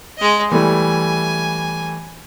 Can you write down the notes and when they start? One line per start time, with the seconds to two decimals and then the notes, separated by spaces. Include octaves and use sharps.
0.18 G#3 D#5
0.51 E3 G3 A3 G#5